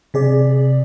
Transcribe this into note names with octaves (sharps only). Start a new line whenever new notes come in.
C3 G#4 D5